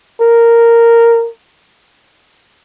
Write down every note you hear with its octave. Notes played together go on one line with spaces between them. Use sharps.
A#4